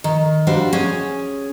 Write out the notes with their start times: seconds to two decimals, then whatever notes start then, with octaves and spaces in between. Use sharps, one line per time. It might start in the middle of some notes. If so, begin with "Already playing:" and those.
0.04 D#3
0.47 G3 D4 F#4 C5 F5
0.73 C#4 G#4